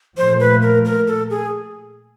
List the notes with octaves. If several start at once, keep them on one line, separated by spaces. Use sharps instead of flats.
A#2 F3 A3 C5
B4
A#4
A#4
A4
G#4